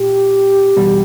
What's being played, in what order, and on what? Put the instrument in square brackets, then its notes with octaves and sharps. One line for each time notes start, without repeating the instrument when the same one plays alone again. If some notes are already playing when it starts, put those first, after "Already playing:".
Already playing: [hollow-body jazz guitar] A#2 [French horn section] G4
[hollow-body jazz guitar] E2 B2 G3